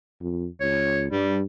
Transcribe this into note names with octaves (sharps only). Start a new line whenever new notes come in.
F2
C#2 C#5
G2 G3